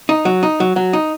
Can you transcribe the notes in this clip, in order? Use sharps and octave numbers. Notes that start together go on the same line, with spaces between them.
D#4
F#3
D#4
F#3
F#3
D#4